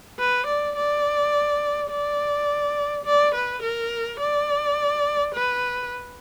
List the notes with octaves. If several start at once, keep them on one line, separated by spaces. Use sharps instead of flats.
B4
D5
D5
D5
D5
B4
A#4
D5
B4